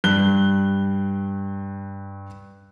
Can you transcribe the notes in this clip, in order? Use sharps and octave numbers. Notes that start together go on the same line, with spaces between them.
G2 F#6 G7